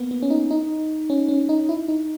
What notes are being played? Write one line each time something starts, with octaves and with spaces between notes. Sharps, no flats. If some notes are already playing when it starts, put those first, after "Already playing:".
Already playing: A#3 B3
B3
C#4
D#4
D#4
C#4
C#4
D#4
E4
D#4